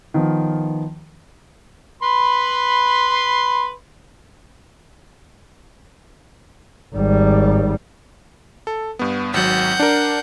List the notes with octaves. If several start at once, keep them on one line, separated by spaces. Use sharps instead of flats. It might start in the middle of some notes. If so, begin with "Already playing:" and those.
D#3 F3 B3
B4 B5 C6
G#1 G3
A4
G2 B3
G#1 F#3 F#5 G6
D4 A#4